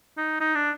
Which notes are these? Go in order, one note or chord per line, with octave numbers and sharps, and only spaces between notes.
D#4
D#4
D4